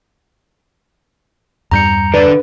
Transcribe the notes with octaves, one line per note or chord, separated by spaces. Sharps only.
E2 G2 G3 A#5 G6 C#7
D3 D4 B4 D5